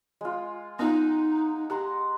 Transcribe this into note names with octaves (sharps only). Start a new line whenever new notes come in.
G#3 F4
B3 D#4 F4 D#5 F5 F#5
G4 F#5 A#5 C6